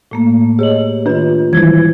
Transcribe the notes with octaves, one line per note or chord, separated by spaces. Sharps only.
A2 A3 A#3
G4 G#4 C#5 D#5 F#7
D#3 D4 F4 B4
D#3 E3 E4 G#6